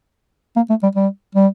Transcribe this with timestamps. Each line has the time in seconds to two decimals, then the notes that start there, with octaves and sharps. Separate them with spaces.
0.56 A#3
0.69 A3
0.83 G3
0.96 G3
1.35 G3